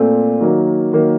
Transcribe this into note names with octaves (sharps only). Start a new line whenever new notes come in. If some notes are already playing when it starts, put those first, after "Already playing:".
Already playing: A#2 A3 C4
D#3 F#3 A#3
D#3 F#3 A#3